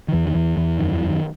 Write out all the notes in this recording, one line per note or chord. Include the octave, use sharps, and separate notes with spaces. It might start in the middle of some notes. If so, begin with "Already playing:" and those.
D#3
E2 E3
D#3
E2 E3
E2 E3
F#2 D#3
E3
F#2
D#3